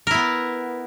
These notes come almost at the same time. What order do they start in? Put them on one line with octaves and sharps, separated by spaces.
A#4 E4 B3